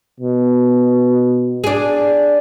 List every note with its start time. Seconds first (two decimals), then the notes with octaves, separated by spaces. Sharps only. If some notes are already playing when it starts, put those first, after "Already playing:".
0.20 B2
1.64 D4 G#4